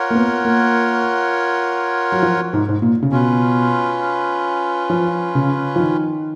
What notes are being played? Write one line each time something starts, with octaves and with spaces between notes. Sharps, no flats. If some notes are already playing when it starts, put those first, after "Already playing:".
Already playing: F4 A#4 C#5 F#5
A#3
B3
A#3
F#3
F3
G#2
G#2
A#2
C#3
B2 C#4 F4 B4
F3
C#3
F3
D#3